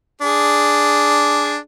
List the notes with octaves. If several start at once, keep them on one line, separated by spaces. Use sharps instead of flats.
D4 G#4